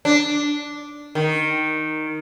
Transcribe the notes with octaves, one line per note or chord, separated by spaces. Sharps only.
D4
D#3